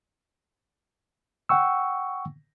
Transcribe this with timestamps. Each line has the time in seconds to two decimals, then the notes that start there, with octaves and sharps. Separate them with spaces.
1.49 F#5 G5 C#6 E6